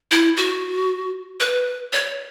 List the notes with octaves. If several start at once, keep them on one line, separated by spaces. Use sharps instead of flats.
E4
F#4
B4
C#5